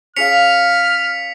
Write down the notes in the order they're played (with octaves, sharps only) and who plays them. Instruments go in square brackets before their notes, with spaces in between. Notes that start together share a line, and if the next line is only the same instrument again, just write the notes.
[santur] C#4 G#4 F5 [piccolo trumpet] F6 [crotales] B6 C#7 F7